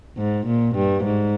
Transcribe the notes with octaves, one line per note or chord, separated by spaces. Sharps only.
G#2
A#2
G2
G#2